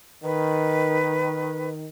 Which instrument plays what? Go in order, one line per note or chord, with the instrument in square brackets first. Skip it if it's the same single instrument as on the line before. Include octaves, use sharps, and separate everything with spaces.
[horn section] D#3 [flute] B4